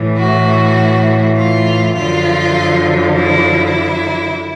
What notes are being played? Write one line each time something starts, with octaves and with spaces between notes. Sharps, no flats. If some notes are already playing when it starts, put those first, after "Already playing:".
Already playing: A2 E3
F#4
F4
F#2 D3 F3 F4
E4